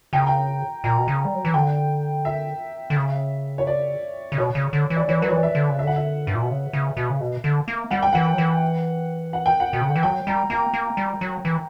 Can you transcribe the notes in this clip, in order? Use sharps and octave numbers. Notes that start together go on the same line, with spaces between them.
C#3 G5
A#5
G5
A#2 A#5
B2
C#3
G3
F#3
E3
D3 G5
E5
D3
C#3
C#5
D5
C#3
B2 C#5
C#3
D3
E3
D5
E3 C#5
F#3 B4
C#5
E3 D5
E5
D3
C#3
E5
D3 F#5
E5
G2
A#2
B2
C#3
C#3
B2
C#3
B2
D3
A#3
G3 F#5
G5
E3 F#5
F#3
E3
F#5
G5
F#5
B2
C#3
D3
E3
F#3 G5
G3 A#5
A#3 A#5
A#3
G3
F#3
E3